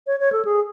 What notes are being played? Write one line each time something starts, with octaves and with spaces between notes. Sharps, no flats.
C#5
C#5
A4
G#4